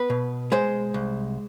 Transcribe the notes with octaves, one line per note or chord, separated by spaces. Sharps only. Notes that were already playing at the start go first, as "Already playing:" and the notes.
Already playing: B3 B4
B2
G#3 C5
C2